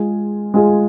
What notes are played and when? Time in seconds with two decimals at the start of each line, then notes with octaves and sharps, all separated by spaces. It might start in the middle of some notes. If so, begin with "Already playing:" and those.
Already playing: G#3 F4 G#4
0.54 G#3 F4 G#4